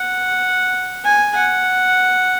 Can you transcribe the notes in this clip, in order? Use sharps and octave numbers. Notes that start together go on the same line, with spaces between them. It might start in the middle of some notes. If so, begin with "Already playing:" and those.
Already playing: F#5
G#5
F#5